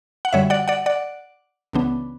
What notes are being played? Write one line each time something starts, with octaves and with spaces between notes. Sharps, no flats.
F#5
F#2 D3 G3 C#5 E5
D5 F#5
D5 F#5
D5 F#5
C#2 C#3 E3 B3 D4